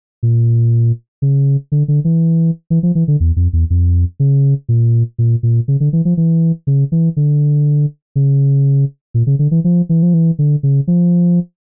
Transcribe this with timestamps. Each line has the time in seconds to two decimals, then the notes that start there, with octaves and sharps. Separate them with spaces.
0.23 A#2
1.22 C#3
1.72 D3
1.88 D3
2.04 E3
2.70 E3
2.83 F3
2.95 E3
3.08 D3
3.20 E2
3.36 F2
3.53 E2
3.70 F2
4.20 C#3
4.69 A#2
5.18 A#2
5.43 A#2
5.68 C#3
5.80 D3
5.93 E3
6.05 F3
6.17 E3
6.67 C#3
6.92 E3
7.17 D3
8.16 C#3
9.14 A#2
9.27 C#3
9.39 D3
9.51 E3
9.64 F3
9.89 E3
10.03 F3
10.14 E3
10.39 D3
10.63 C#3
10.87 F3